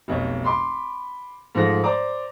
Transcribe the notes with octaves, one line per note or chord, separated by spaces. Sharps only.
F1 B1 C#5
B5 C6 D6
G#2 F3 A3 A#6
C5 D5 A#5 D6